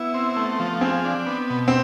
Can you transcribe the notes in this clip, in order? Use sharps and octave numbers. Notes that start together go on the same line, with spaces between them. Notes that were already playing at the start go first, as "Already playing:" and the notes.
Already playing: B3 E4
C4
A3
F3
C4 G#4
D4
B3
B2
C4